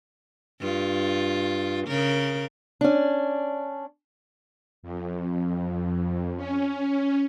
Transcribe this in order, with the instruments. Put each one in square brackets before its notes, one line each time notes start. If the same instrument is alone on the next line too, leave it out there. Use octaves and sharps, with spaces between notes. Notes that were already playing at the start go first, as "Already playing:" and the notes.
[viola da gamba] G2 F4
C#3 A#4
[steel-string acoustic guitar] C#4 D4
[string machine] F2
C#4